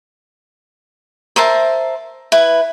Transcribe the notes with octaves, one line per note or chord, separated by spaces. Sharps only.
A#4 C5 E5 A5
E4 B4